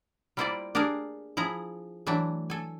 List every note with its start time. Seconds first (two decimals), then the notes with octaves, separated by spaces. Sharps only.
0.37 G3 A#3 E4 F4 C5 D5
0.75 D4 G4 G#4 A#4 F5
1.37 F3 E4 G#4 A#5
2.07 E3 F#3 A3 D4 E5
2.50 A4 G#5